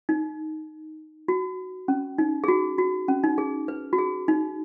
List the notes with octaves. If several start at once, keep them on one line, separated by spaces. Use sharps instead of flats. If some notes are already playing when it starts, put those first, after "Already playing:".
D#4
F#4
C#4
D#4
G#4
F#4
F#4
C#4
D#4
G#4
B4
F#4
G#4
D#4